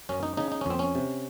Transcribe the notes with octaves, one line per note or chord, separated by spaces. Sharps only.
F#2 C#4
D#4
C#3 D#4
D#4
C#4
F2 C4
C#4
C3